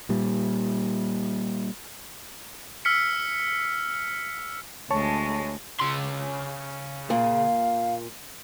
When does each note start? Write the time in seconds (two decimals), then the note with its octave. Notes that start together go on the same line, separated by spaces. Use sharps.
0.09 A#2 G3
2.85 E6 F6 B6 C#7
4.91 D2 G#3 C#5 A5 C#6
5.80 C#3 C6
7.10 A#2 F5